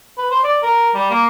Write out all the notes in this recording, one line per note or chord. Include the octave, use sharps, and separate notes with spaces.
B4
C5
D5
A#4
G3
A#3